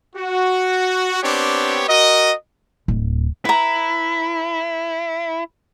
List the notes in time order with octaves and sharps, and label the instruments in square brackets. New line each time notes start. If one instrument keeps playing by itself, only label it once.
[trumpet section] F#4
B3 C4 D4 G4 C#5
F#4 A#4 D#5
[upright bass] D1
[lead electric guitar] E4 [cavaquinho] B4 A#5